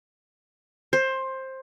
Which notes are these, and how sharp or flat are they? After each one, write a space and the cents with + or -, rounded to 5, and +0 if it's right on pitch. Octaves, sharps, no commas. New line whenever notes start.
C5 +15